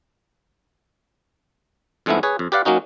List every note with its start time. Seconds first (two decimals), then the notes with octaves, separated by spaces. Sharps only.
2.06 F2 G#2 G#3 A3 B3 E4
2.23 G#4 B4 C#5
2.39 F2
2.52 G4 B4 D5 F5 F#5
2.65 F#3 A#3 C#4 D#4 F#4